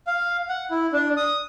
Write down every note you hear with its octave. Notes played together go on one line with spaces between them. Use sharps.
F5
F#5
E4
D4
D#6